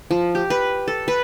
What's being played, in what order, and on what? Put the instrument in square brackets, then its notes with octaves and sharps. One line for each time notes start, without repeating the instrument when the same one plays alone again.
[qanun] F3
G4
B4
A4
B4